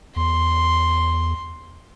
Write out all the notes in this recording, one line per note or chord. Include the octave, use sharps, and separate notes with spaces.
E2 C6